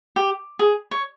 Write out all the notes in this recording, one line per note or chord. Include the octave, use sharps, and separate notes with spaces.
G4
G#4
C#5